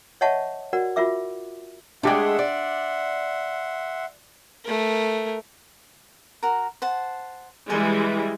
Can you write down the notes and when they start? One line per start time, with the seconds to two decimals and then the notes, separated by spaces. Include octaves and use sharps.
0.21 C#5 D#5 E5 F#5 A5 C#6
0.73 F#4 A#4 D5 F#5
0.96 F4 F#4 A#4 E5 D6
2.03 G#3 A3 D4 G4 E5 F#5 C6 D6
2.39 D5
4.64 A3 A#4
6.43 F#4 A#4
6.82 C5 F#5 A5
7.70 E3 G3 G#3 D5 G#5 C6